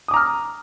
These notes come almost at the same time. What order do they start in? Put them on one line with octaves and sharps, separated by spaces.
D#6 D6 A#5 F6